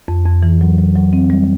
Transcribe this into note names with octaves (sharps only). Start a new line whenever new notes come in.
F2
F2
E3
F#3
F#3
F#3
C4
G3